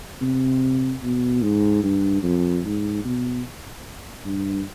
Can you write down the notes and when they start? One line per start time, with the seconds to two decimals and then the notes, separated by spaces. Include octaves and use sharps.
0.22 C3
1.03 B2
1.42 G#2
1.84 G2
2.23 F2
2.65 G#2
3.05 B2
4.26 G2